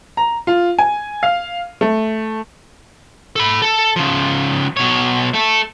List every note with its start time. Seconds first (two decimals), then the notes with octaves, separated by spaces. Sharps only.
0.17 A#5
0.47 F4
0.79 G#5
1.23 F5
1.81 A3
3.36 A4 B5
3.62 A4
3.96 C#3 F3
4.77 B2 C#5
5.34 A3 A4